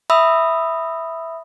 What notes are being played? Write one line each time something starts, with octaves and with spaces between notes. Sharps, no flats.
E5 B5 D#6 E6